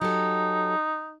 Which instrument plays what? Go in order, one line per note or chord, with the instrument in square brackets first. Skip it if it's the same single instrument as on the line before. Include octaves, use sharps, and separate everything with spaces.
[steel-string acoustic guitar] F#3 G4 A4 [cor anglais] D#4